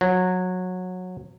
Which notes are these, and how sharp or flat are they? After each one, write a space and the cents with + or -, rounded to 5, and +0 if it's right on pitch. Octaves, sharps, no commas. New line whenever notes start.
F#3 -20